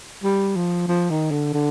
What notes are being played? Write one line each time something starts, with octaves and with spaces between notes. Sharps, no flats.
G3
F3
F3
D#3
D3
D3